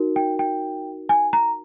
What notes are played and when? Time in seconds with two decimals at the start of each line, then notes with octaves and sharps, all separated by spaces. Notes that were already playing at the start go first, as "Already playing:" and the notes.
Already playing: D#4 F#4 A#4
0.16 G5
0.39 G5
1.09 G#5
1.33 A#5